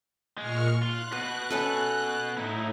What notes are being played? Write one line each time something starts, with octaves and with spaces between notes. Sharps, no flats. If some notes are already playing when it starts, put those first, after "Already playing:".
A#2 G#3 C#6 F6
F4 F#6
B2 F#4 B4
C#4 A4 B4
A2 D#4 E4